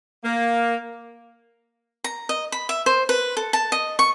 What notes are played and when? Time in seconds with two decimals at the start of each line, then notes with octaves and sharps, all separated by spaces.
0.24 A#3
2.04 A#5
2.29 D#5
2.52 B5
2.69 E5
2.86 C5
3.09 B4
3.37 A4
3.53 A5
3.72 D#5
3.99 C#6